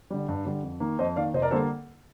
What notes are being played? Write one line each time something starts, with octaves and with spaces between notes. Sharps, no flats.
D3 G3
G2
D3 G3
F2
D#3 A#3
F2 C5 D#5
D#3 A#3 D5 F5
F1 C5 D#5
A#4 D5
D3 G3 A#3 A4 C5